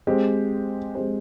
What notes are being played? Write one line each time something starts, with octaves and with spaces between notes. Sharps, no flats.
G#3 C4 G4 C5
G#3 C4 G4 C5